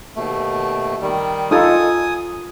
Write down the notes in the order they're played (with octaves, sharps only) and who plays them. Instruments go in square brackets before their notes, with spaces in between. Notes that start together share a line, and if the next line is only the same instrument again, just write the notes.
[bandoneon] D#2 B2 A3
D#3 G3
[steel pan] D#4 F4 A4 [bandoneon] G#5 D#6